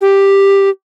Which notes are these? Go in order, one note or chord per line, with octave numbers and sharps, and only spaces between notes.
G4